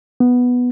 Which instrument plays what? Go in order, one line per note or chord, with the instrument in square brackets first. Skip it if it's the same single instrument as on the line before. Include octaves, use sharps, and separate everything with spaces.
[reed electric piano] B3